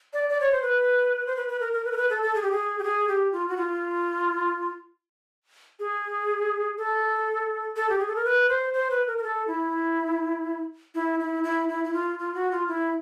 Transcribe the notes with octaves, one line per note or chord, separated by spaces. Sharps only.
D5
D5
C#5
C5
B4
C5
B4
B4
A#4
A#4
B4
A#4
B4
A4
A4
G#4
G4
G#4
G4
G#4
G4
F4
F#4
F4
G#4
A4
A4
G4
G#4
A4
A#4
B4
C5
C5
B4
A#4
A#4
A4
E4
E4
E4
E4
E4
E4
F4
F4
F#4
F4
E4